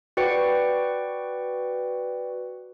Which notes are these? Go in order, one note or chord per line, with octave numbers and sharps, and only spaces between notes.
F#4 B4 D5 G5 C#6 C#7